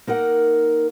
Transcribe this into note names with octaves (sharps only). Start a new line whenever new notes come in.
A#3 D#4 A#4 F#5